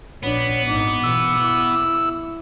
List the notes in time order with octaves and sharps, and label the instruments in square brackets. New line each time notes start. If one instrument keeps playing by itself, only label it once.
[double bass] A#1 D4 [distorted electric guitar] B3 [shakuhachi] C#5
[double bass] G#1 D#4 [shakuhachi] D6
[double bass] B2 E3 [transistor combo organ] E6
[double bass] E4